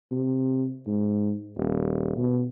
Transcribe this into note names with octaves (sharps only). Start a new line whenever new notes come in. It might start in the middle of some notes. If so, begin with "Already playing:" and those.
C3
G#2
D#1
B2